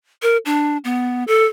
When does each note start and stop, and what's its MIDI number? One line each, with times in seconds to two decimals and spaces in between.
0.22 0.37 70
0.45 0.78 62
0.84 1.24 59
1.27 1.45 69